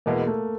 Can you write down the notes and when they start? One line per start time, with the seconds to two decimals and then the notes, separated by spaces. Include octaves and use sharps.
0.06 E2 B2 G#3 A#3 B3 E4
0.27 A3